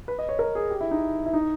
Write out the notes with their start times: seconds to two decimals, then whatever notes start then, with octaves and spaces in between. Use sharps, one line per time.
0.08 B4
0.19 D#5
0.29 C#5
0.39 A#4
0.55 G#4
0.70 G4
0.81 E4
0.91 D#4
1.26 E4
1.33 D#4